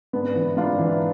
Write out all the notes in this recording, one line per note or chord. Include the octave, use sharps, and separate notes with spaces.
G#2 B3 D4
E3
G#2 D4 F4
E3